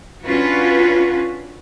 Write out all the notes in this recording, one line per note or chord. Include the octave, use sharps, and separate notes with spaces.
C#4 D4 F4 F#4 B4